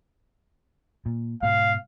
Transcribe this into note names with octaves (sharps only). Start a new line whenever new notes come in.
A#2
G#2 B2 F5